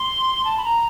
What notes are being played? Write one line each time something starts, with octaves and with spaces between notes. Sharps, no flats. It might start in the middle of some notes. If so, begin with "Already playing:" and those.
Already playing: C6
A5
B5
A#5